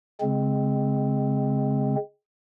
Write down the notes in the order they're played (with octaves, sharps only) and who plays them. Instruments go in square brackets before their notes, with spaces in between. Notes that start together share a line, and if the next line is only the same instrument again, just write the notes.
[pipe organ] C#3 G#3 C4